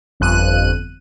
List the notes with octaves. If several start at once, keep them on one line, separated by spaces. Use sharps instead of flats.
G1 F2 F#6 D#7